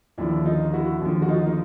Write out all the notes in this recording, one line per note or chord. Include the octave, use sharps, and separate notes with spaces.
D#2 D3 F3 D4 E4
D#4 F4
E4 F#4
D#2 D3 F3
F#4
D#4 F4
D#4